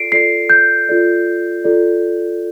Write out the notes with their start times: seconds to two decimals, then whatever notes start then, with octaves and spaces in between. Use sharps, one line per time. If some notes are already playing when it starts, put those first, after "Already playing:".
Already playing: F4 A4 D5 C7 D7
0.12 F4 A4 D5 C7
0.50 G6
0.89 F4 A4 D5
1.64 F4 A4 D5